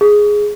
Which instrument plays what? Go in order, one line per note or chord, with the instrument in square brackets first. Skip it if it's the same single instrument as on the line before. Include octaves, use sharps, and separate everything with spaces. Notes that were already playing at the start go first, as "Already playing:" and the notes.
[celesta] G#4